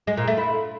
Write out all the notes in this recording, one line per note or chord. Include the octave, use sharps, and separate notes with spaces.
G#3
A#2
A3
E4